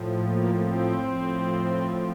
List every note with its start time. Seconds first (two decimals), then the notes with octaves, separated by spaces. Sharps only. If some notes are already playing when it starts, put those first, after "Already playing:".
Already playing: A2 F3
0.24 A#3
0.60 C4
0.96 A2 F3